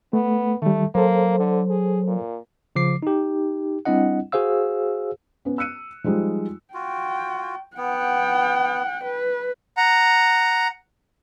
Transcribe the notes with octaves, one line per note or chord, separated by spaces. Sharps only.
A3 B3
D#3 G3 A3
F#3 A#3 A4 C5
D3
G#4
A#2
C#3 F3 D6 C7
D#4 G4
G3 C4 D4 E4 D#5 F#5
F#4 G#4 C5 F5 E6
B3 C#4
E6 F#6 C#7 D#7
F3 G3 G#3 D#4
F4 F#4 G5
B3 F#5 G5
B4
F#5 A#5